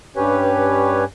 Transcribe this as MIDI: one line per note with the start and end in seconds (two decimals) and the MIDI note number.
0.16 1.04 43
0.16 1.04 61
0.16 1.04 67
0.16 1.04 71
0.16 1.04 73